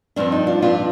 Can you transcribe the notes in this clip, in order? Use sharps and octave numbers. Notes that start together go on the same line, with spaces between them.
G2 F3 C4 D4
D#4
D4 F4
G2 F3 C4 D4 F4